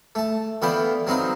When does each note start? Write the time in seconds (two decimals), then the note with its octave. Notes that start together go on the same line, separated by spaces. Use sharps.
0.15 A3 A5
0.62 D3 E3 B3 F5 G5 B5
1.07 F#3 C4 D#4 B4 F5